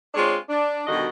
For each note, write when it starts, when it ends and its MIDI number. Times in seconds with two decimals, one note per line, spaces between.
0.14 0.35 56
0.14 0.35 60
0.14 0.35 62
0.14 0.35 65
0.14 0.35 73
0.49 0.83 62
0.87 1.08 43
0.87 1.08 47
0.87 1.08 50
0.87 1.08 51
0.87 1.08 66
0.87 1.08 75